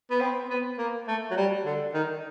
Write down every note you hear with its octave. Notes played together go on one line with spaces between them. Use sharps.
B3
C4
B3
A#3
A3
F#3
G3
D3
D#3